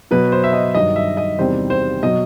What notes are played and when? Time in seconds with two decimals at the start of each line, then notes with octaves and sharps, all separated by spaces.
0.11 B2 F#3 B4
0.32 C5
0.44 E5
0.53 D#5
0.75 G2 D#3 F#3 D#5
0.96 E5
1.17 D#5
1.39 E2 C3 D#3 G3 C5
1.70 C5
2.03 B2 F#3 D#5